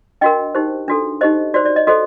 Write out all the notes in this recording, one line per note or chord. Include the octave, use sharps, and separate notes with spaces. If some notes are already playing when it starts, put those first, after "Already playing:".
D4 F#4 A#4 D#5 G5
D#4 G4 C5
D4 F#4 A4
D#4 G4 C5 D#5
F#4 C5 D5
D5
D#5
F#4 A4 C5 D#5